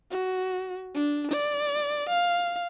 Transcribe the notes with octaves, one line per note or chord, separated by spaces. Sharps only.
F#4
D4
D5
F5